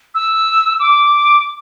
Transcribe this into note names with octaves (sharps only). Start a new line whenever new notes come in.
E6
D6